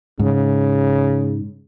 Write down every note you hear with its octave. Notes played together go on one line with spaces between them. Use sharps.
G#2 C#3